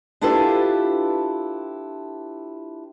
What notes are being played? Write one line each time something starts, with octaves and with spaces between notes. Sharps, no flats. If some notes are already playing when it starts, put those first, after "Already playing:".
D4 E4 F4 G4 A4 B4